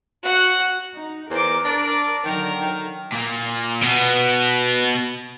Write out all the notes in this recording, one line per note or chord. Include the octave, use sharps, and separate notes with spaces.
F#4 F#5
D#4
E2 A#4 C5 D6
D4 D5
D3 D#3 F#3 A#4 A#5
D#3
A#2 A#3
B2 B3